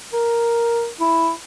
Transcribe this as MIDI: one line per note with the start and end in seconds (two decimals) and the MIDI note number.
0.13 0.87 70
1.01 1.30 64